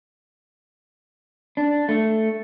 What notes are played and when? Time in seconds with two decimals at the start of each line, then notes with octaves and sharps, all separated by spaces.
1.57 D4
1.89 A3